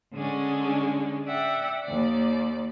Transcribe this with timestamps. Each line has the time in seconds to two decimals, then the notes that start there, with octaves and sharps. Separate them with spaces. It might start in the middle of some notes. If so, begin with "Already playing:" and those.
0.14 D3 G#3 C#4 D4
1.25 D5 E5 F#5 G5
1.84 D#2 D5